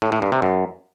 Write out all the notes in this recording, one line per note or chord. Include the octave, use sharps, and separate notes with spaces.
A2
A2
G2
C3
F#2